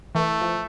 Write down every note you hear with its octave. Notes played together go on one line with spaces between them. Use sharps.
E3 A3
F3